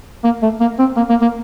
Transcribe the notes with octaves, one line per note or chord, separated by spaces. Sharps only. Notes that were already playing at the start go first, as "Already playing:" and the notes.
A#3
A3
A#3
C4
A#3
A#3
A#3